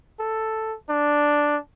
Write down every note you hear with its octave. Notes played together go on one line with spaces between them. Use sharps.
A4
D4